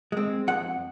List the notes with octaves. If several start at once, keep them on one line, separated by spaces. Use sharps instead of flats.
G#3 C4
F2 F#5